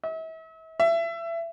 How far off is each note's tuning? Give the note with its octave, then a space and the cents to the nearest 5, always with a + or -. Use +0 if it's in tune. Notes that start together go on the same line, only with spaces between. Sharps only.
E5 -40
E5 +25